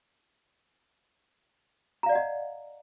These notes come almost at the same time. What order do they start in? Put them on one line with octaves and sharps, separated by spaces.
A#5 F5 D5 F#5 D#5